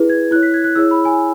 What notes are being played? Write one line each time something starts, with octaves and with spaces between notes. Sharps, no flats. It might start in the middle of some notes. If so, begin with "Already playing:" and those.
Already playing: E4 G#4 B4
G#6
E4 C#5 F#6
B6
G#6
F#6
E4 G#4 C#5 E6
B5
G#5